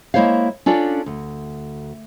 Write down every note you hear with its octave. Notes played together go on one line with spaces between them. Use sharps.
G#3 A#3 E4 C5 C#5 F5
C#4 D4 F4 A4 D5
D2